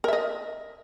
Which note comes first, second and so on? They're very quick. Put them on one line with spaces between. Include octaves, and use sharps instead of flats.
A#4 E5 D#5